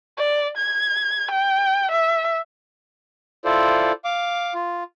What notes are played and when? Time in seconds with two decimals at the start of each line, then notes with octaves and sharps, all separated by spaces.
0.17 D5
0.57 G#6
1.31 G5
1.91 E5
3.44 E4 F4 A4 C5 D5
4.05 F5 D6
4.54 F4